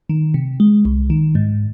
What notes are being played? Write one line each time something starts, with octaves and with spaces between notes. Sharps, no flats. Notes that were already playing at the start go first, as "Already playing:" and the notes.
D#3
C3
G#3
C2
D#3
G#2